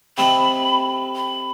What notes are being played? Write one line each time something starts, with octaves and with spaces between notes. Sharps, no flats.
C3 A3 D#4 G5 B5
B5